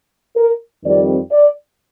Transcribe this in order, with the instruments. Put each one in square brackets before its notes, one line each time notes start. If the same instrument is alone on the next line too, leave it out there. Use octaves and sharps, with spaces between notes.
[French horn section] A#4
F2 D#3 G3 C4 D5
D5